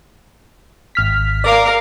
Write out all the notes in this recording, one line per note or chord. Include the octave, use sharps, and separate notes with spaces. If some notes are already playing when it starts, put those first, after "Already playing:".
G#1 F6 B6
A#4 D5 F5 D6